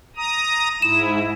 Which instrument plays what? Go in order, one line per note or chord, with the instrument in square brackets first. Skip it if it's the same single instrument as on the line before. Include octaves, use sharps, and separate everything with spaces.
[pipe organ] A#5 D#6
[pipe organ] G#2 E4 [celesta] E7